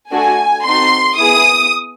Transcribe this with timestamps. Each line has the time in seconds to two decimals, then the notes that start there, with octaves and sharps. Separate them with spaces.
0.11 A3 D4 F#4 A4 G#5
0.64 C4 D#4 F#4 A4 C6
1.19 B3 E4 G#4 D#6